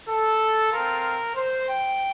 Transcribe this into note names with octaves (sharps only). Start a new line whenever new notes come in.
A4
C4 F4 A#4
C5
G5